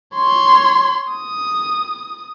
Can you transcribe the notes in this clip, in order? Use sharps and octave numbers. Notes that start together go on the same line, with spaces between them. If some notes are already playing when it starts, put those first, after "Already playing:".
C#5 C6
D#6